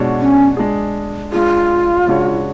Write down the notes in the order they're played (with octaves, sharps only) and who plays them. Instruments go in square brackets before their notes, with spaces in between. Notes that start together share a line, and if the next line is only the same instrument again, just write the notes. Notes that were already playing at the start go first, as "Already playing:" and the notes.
Already playing: [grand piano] B2 G#3 D4 F#4 C#5
[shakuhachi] C#4
[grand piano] G#3 D4 G#4
[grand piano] G#3 D4 G#4 [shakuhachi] F4
[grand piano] C#3 G#3 D4 F#4 C#5